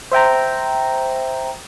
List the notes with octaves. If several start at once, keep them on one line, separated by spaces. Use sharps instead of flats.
C5 E5 G5 A#5